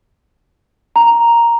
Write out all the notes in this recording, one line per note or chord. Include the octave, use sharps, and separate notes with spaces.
A#5